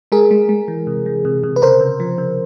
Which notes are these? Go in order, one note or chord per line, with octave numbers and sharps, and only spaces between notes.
G#3 G#4 A#4
G#3
G#3
E3
C3
E3
C3
C3
B4
C#3 A#4 C5
C#3
F3
C#3